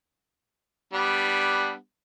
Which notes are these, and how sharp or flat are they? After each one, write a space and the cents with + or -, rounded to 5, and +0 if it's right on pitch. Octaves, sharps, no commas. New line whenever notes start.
G3 +0 B3 +0 D4 +0